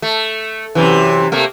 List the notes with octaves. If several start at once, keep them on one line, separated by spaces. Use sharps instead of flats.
A3
F#2 C3 E3
C3 A3 A#3